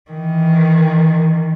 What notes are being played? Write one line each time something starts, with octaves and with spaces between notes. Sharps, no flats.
D#3 E3